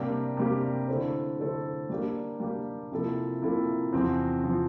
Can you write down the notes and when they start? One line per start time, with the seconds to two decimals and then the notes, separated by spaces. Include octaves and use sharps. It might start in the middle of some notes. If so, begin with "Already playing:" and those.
Already playing: C3 G3 A#3 D4 G4
0.37 C3 G3 A#3 D4 G4
0.88 D3 A3 E4 A4 C5
1.39 D3 A3 E4 A4 C5
1.89 G3 A#3 D4 G4
2.40 G3 A#3 D4 G4
2.92 C3 F3 A#3 E4 A4
3.42 C3 F3 A#3 E4 A4
3.93 E2 C3 F3 C4
4.43 C3 F3 C4